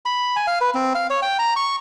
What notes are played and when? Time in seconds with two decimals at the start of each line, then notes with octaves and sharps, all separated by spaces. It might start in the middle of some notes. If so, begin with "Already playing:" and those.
0.06 B5
0.36 G#5
0.47 F5
0.61 B4
0.74 C4
0.95 F5
1.10 C#5
1.22 G5
1.39 A#5
1.56 C#6